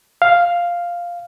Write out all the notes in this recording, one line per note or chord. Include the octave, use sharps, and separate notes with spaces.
F5